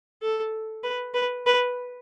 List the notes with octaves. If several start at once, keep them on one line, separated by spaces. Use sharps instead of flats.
A4
B4
B4
B4